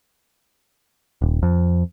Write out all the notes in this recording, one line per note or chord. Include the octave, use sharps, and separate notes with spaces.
D#1
F2